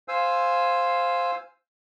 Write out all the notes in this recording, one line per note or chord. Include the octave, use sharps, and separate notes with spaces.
C5 F5 G#5 E6